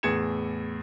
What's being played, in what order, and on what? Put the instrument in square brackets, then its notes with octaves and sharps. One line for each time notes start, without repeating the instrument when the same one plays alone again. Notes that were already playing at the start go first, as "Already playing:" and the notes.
[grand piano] E2 A2 G#4 G#6 C#7 E7